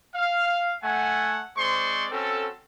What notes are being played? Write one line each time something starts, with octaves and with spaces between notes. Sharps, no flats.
F5
A3 F#5 G#5
G#3 C4 C5 D5 C6 C#6
C4 C#4 F#4 A4